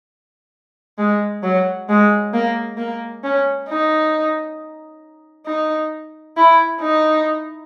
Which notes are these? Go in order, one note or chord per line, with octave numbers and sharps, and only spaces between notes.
G#3
F#3
G#3
A#3
A#3
C#4
D#4
D#4
E4
D#4